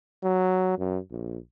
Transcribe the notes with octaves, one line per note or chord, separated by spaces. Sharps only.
F#3
F#2
A#1